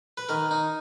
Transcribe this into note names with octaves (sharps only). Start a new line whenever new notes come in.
B4
D#3 A#4
D#4